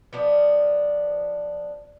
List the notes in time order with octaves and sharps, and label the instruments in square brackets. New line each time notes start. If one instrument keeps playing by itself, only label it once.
[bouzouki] F3 B3 D4